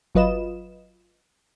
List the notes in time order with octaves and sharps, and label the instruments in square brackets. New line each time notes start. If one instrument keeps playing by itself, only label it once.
[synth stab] G1 F#3 F4 B4 D#5 E7